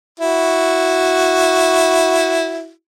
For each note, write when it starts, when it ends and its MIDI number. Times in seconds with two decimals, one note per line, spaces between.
0.20 2.71 64
0.20 2.71 66